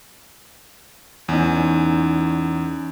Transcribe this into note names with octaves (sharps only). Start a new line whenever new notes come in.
E2 C#4 D#4